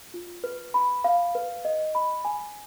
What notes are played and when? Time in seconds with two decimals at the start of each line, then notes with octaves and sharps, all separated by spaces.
0.14 F4
0.44 B4
0.74 B5
1.04 F5
1.35 B4
1.65 D#5
1.95 B5
2.25 G#5